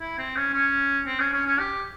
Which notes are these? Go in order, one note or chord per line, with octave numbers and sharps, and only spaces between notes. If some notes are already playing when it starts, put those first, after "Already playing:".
E4
C4
C#4
C#4
C4
C#4
C#4
C#4
G4